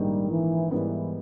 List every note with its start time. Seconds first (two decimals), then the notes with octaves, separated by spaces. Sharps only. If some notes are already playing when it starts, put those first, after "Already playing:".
Already playing: A#1 G#2 D#3 G3 A#3 D#4
0.29 E3
0.71 G#2 E3 G3 B3 E4 A#4